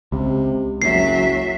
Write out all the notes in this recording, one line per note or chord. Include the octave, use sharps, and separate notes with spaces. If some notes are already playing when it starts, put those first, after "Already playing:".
C#2 C3
F#1 F#3 E5 C7